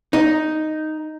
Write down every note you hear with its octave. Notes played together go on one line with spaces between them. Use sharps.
D#4